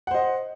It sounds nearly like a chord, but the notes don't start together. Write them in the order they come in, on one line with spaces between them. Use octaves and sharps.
F#5 C5 D#5